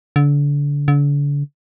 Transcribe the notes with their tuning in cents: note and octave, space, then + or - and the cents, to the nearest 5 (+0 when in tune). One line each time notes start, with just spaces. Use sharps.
D3 -30
D3 -40